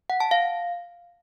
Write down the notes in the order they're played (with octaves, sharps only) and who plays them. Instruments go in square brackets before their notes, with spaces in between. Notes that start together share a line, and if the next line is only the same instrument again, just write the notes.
[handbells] F#5
A5
F5